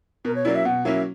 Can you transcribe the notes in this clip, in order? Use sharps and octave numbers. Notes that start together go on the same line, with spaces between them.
B2 A#4
C#5
F#3 A#3 C#4 E4 D5
E5
B2 F#5
F#3 A#3 C#4 E4 E5